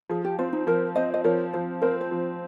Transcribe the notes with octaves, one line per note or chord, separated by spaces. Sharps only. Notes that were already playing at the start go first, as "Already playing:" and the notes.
F3 G#4
G4
C4 F4
D#4
F3 A#4
C4 C5 D#5
D#5
F3 A#4 C#5
F3 C5
C4 A#4
C5
F3